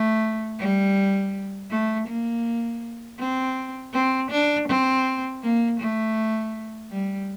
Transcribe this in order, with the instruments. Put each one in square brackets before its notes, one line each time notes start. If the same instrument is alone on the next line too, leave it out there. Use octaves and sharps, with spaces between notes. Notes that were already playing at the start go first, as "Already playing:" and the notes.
Already playing: [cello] A3
G3
A3
A#3
C4
C4
D4
C4
A#3
A3
G3